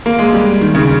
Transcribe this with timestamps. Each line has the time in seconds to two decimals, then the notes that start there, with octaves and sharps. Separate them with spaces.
0.06 A#3
0.19 G#3
0.33 G3
0.61 D#3
0.75 C#3